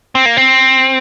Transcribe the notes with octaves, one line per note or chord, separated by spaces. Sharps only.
C4
A#3
C4